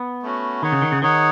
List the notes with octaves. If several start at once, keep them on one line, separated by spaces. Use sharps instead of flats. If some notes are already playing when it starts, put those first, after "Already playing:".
Already playing: B3
A3 C#4 F#4
D#3 D#4 G#4 C#5 F#5
C#3
D#3
C#3
D#3 D#4 G#4 C#5 F#5